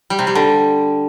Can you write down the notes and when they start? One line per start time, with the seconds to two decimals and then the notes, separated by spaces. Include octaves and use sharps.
0.10 G3
0.19 C3
0.27 G3
0.35 D3